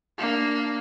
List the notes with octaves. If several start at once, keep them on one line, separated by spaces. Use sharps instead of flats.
A#3 D4